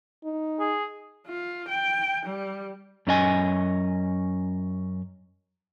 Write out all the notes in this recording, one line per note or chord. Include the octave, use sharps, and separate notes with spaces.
D#4
G#4
F4
G5
G3
F#2 C#4 D#5 G#5